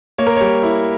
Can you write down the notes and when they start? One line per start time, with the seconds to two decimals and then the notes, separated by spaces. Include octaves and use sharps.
0.18 A#3 C#5
0.27 A#4
0.36 G3 C#5
0.63 E4